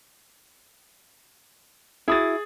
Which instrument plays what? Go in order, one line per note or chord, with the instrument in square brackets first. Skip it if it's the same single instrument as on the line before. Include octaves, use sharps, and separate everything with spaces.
[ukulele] E4 F#4 [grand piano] G#4 D#6 A6